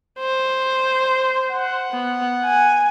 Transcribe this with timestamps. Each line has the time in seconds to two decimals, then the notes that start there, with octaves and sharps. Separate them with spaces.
0.20 C5
1.51 F#5
1.91 B3
2.45 G#5